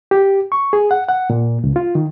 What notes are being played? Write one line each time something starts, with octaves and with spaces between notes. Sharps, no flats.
G4
C#6
G#4
F#5
F#5
A#2
C#2
F4
D#3